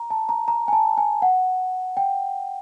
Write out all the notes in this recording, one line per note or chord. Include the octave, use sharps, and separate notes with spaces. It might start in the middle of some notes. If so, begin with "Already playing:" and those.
Already playing: A#5
A5
A#5
A#5
G#5
A5
G#5
F#5
G5